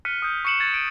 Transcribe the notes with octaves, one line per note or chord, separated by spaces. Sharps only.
F6 F#6 B6 C#7 D#7
D#6 G6
C#6 B6 C#7 E7 F#7
G#6 A6 E7 F#7
D7 D#7